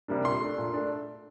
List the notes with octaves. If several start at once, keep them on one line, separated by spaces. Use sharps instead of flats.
C3 G3 A#3 D4
A#2 C6
A3 D4
A#2
A3 D4